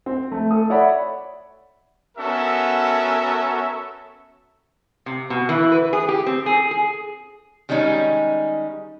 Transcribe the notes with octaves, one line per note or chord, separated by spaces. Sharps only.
C4
A3
A4 D#6
C#5 D5 E5 F#5 B5
B3 C#4 F#4 A4 A#4 E5
C3
B2
E3
B4
G#4
G4
C4
G#4
G#4
D#3 G3 G#3 C#4 D#4